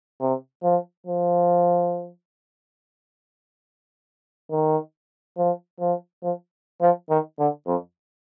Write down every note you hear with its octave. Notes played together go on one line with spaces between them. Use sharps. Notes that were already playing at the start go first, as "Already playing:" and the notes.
C3
F3
F3
D#3
F3
F3
F3
F3
D#3
D3
F2